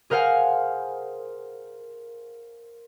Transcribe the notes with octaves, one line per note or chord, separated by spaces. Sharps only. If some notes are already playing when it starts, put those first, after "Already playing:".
G#4 A#4 C5 F5 F#5 G#5